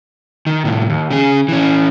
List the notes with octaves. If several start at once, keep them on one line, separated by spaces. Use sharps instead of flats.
D#3
A2 C3
D#2
C#3 G#4
E3 C#4